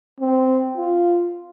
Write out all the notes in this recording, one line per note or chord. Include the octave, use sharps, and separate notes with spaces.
C4
F4